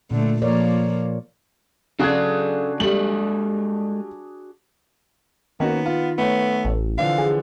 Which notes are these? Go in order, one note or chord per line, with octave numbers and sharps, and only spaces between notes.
A#2 D3 A3
F3 A#3 A#4 C#5 D5
C#3 D4 F#4 G#4 A4 F5 F#6 G#6
G3 G#3 A4 F#7
D#3 A#3 B3 C#4 F#4
F4
A3 B3 C#5
A1
D3 E3 F3 F5
G#4